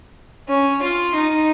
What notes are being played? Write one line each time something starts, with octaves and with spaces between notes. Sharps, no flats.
C#4
F4
D#4